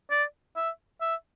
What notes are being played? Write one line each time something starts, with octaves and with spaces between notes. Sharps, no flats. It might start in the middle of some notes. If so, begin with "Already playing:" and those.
D5
E5
E5